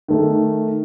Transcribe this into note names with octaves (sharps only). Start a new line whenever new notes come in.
D#3 A3